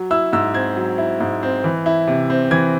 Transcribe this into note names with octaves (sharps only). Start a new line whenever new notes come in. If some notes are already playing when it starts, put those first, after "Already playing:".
Already playing: F#3
E4 E6
G#2 E6
C4 G#6
F#3
E4
G#2
C4
E3
E4
C3
C4
E3 G#6